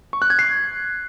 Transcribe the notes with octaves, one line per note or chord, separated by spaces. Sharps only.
C#6
F#6
G#6
C7